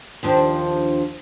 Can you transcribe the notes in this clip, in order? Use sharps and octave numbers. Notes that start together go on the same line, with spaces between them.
D#2 F3 D4